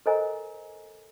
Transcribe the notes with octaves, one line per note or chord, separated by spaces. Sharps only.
A4 A#4 C5 D#5 G#5 A#5